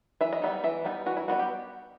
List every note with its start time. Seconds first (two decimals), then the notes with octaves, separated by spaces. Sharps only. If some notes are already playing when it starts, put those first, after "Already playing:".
0.21 E3 E5
0.33 D#5
0.42 G3 B3 D#4 E5
0.64 E3 E5
0.84 G3 B3 D#4
1.06 E3 F#4
1.17 E4
1.28 G3 B3 D#4 F#4
1.39 G4